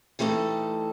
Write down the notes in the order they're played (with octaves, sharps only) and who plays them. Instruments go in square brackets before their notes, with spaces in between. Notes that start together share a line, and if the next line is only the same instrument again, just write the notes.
[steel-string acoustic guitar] E3 G3 A3 D#4 A4